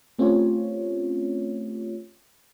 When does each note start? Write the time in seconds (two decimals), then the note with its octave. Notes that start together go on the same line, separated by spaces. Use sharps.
0.18 A3 C4 C#4 F4 G4 C#5